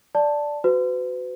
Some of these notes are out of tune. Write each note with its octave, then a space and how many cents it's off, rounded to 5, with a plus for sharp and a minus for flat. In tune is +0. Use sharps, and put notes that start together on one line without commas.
D5 +0 A5 +0
F#4 +0 B4 +40